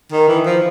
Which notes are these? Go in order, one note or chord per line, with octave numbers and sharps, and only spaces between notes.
D#3
E3
F3